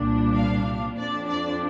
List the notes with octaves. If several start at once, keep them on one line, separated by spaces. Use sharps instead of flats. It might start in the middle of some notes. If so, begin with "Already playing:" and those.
Already playing: C2 A#2 G3 D4
F5
F2 F3 D4 D5
D5